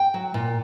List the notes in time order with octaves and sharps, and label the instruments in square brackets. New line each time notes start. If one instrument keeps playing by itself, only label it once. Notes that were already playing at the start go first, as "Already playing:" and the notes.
Already playing: [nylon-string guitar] G5
F#3
A#2